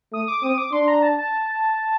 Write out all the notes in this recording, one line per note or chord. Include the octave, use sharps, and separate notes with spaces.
A3 D#6
D6
C4 D#6
D6
D4 C6
A#5
A5
A5